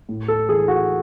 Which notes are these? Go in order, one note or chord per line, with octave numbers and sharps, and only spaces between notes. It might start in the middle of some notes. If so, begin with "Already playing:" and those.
A2
A4
E3 G#4
F#4